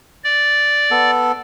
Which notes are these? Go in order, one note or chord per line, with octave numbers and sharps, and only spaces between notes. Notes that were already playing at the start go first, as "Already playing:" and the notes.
D5
B3 A4